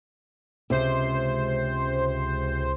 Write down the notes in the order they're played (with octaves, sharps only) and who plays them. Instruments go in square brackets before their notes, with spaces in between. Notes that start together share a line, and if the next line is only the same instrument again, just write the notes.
[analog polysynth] C#2 C5 [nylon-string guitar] C3